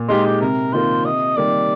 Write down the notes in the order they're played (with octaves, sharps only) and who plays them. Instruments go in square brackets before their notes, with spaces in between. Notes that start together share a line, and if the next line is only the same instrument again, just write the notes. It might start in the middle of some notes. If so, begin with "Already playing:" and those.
Already playing: [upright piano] A#2
[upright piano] G#3 D#4 G4 [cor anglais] F4
[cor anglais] G4
[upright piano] C3 [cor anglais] A#4
[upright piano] D#3 A#3 F4 A#4 [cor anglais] C5
[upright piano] C3 [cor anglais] D#5
[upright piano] D#3 G3 A#3 [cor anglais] D5